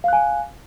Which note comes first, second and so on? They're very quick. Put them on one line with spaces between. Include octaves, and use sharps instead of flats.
F5 F#6 G#5